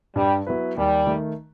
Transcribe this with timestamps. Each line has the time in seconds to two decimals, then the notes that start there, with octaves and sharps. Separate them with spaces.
0.16 G2 G3
0.47 F#3 B3 E4 B4
0.77 D#2 G3
1.07 D#3 A3